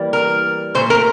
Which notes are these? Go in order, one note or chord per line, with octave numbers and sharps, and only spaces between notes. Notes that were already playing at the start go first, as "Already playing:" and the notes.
Already playing: E3 G3 A#3
A#4
A#2 A3 C5
A#4